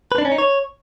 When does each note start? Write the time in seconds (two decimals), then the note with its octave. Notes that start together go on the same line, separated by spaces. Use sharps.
0.12 B4
0.18 D4
0.25 C#4
0.32 D#4
0.38 C#5